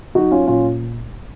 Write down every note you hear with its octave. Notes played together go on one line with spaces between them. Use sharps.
F#3 D#4 F#4
C#4 F4
A#2 C#4 F4